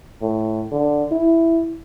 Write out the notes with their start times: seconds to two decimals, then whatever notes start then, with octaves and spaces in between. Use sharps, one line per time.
0.22 A2
0.72 D3
1.12 E4